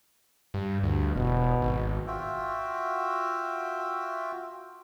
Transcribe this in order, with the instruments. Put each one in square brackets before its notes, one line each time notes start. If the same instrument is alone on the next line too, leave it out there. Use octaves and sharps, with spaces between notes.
[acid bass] G2
[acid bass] D2 [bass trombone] G2
[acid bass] E1 [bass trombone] B2
[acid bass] G#1
[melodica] F4 F#4 E5 G5